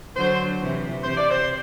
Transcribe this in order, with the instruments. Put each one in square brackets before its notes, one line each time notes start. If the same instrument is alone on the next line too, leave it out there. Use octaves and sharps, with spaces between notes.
[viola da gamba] D3 F#3 [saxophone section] C5
[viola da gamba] C3 E3
[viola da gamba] C3 [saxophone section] C5
[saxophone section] D5
C5